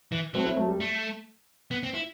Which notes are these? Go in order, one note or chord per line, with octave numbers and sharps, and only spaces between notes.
E3
F#3 A3 C4
C4 E4
F#3 A3
G3
A3
B3
C4
E4